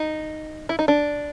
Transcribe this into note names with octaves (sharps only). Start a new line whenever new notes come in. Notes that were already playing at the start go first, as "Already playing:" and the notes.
Already playing: D#4
E4
D#4
D4